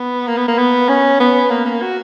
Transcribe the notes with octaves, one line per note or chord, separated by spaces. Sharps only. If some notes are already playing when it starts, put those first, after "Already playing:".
Already playing: B3
A#3
B3
A#3
B3
C#4
B3
A#3
A#3
F#4